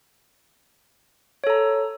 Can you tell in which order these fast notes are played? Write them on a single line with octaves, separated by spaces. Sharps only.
C#5 A4 A#5